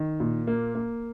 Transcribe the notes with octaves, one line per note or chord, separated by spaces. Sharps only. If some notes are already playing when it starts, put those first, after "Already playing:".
Already playing: D#3
A#2
A#3
A#3